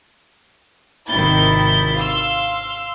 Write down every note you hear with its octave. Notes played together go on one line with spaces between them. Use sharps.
G#1 C3 D#3 E4 G6 A6
F5 C6 E6